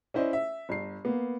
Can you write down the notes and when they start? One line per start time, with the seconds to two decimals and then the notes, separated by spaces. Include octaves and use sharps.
0.14 C#4 E4 C5 D5 D#5
0.33 E5
0.69 G1 C7
1.05 A#3 B3